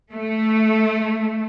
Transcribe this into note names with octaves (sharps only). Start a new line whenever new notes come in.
A3